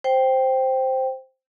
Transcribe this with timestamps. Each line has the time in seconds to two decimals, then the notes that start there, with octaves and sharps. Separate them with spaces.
0.04 C5 G5